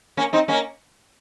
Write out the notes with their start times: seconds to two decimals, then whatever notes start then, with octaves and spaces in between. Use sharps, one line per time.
0.17 A#3 C#4
0.33 C4 D#4
0.48 A#3 C#4